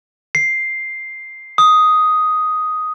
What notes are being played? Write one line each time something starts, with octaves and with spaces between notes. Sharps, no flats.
C7
D#6